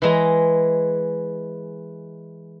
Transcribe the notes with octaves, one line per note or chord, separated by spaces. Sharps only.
E3 G#3 A#5